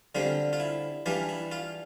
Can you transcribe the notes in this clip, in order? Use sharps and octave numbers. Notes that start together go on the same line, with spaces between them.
D3 G3 C4 F4
F4
E4
E3 G3 D4 F4
E4
F4